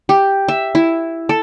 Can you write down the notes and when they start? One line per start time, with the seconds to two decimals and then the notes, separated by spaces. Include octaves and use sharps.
0.09 G4
0.48 E5
0.75 E4
1.29 A4